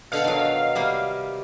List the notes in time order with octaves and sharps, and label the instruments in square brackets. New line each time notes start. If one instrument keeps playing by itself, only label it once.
[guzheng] B2 D3 F#5 [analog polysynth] F5
[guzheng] D#3 F#3
C3 G3 A#3